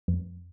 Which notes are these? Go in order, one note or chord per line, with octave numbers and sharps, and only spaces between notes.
F2